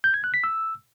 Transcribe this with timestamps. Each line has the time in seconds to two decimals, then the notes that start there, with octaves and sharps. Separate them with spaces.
0.04 G6
0.14 G#6
0.24 F#6
0.34 B6
0.44 E6